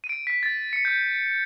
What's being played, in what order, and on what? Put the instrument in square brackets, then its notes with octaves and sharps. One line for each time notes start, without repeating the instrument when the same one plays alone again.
[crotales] D#7
D7
B6
A6
C#7
G6